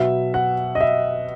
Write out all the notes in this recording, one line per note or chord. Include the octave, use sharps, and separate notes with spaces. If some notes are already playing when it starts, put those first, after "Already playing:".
Already playing: B2 F#3 E5
F#5
D#5
E5